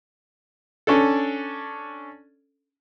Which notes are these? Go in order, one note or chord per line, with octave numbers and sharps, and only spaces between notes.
C#4 D4 A4